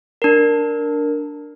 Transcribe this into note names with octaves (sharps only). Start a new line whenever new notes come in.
D4 A#4